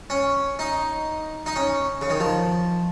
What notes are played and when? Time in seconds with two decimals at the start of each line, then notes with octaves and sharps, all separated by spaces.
0.10 C#4
0.59 D#4
1.46 D#4
1.56 C#4
2.01 C#3
2.10 D#3
2.20 F3